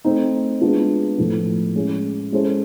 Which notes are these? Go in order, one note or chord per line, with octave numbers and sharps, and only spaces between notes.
A3 C4 D#4
G#3 B3 D4 F4
A2 F3 A3
G#3 C#4 E4
G#3 C#4 E4 A4 C5